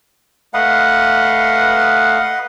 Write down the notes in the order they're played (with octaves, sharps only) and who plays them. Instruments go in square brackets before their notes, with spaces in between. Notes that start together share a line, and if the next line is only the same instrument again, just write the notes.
[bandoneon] A3 F5 [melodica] B4 D#5 F#5